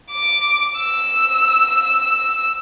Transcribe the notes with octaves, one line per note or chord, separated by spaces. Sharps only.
D6
E6